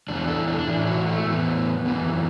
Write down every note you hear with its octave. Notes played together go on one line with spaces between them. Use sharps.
E2 E3 D4
A4
D4
A2 E3 E4
F#4
A3
A2 E3 B3
F#2 E3